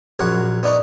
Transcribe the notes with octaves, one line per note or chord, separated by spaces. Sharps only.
A#1 F#2 F#3 F#5
B3 D4 D#4 D5 C#6